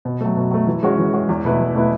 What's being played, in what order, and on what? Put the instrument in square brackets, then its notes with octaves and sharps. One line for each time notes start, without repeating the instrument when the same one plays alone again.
[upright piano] B2
F#3 A3
B2
F#3 A3
E3
G#3 C#4 F#4
E3
G#3 C#4 F#4
E2
B2 A3 E4 B4
E2
B2 A3 E4 B4